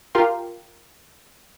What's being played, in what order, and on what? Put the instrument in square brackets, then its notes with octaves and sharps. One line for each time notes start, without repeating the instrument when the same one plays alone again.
[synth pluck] F4 G4 A#4 F5 G5 C6